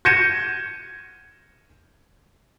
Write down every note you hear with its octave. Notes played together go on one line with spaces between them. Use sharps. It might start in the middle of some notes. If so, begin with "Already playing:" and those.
G6 G#6 A#6 C#7 D#7 E7